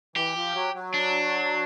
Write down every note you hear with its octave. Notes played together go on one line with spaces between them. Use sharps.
E3 G4
F3
F#3
F#3
D4